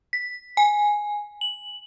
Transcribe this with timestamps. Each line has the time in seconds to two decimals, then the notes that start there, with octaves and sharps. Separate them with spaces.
0.13 B6
0.57 G#5
1.41 F#7